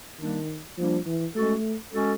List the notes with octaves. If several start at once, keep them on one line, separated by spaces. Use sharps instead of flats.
D#3 G3 A#3 D4
F3 G3 A#3 D4
E3
G#3 A3 C#4 F#4 A4
G#3 C#4 F#4 A4